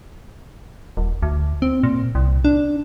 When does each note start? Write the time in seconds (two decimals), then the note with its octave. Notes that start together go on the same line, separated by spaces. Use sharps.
0.97 D#1
1.22 D2
1.62 C4
1.83 A#2
2.15 C2
2.45 D4